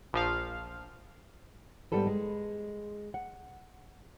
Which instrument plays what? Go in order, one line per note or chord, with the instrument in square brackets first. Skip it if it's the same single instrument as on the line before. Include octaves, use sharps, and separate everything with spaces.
[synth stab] A#1 F3 F5
[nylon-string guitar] G#2 G3 B3 A4 B4
G#3
F#5